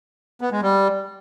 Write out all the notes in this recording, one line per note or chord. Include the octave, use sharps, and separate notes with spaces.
B3
G#3
G3